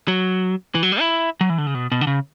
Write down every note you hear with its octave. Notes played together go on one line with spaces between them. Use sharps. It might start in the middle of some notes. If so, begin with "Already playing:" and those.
F#3
E3
F#3
G3
E4
F#3
E3
D3
C#3
B2
B2
D3
C#3